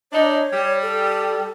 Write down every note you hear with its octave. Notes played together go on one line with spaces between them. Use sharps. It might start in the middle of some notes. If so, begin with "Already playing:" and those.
D4 D#4 C#5
G3
A4